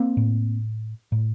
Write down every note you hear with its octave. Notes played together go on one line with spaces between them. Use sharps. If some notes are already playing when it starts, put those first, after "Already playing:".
Already playing: A#3 C4
A2
A2